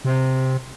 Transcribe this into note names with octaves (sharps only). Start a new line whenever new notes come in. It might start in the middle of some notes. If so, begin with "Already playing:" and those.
C3